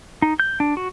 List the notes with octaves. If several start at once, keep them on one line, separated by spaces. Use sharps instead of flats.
D#4
G6
D4
F#4